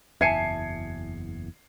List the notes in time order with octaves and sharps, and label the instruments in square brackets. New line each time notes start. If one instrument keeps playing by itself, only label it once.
[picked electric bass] F#1 E2 [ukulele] E5 G#5 A5 [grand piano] G#6 C7 C#7